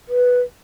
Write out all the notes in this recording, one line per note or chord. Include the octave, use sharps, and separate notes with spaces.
B4